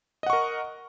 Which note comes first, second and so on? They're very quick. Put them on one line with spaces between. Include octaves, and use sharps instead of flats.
D#5 F#5 C#6 A#4